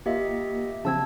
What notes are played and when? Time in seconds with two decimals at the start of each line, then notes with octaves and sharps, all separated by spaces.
0.06 A#3 F4 G4 D#5 E5
0.85 C#3 F3 C4 A5 E6 G#6